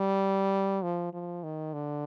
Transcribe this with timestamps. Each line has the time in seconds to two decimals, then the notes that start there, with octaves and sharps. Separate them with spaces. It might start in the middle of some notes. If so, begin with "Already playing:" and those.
Already playing: G3
0.82 F3
1.13 F3
1.43 D#3
1.73 D3